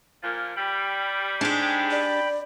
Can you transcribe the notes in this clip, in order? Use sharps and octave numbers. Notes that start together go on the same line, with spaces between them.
A#2 F3 A#3
G3 G5 B5
G#2 G#3 D4 G4
D5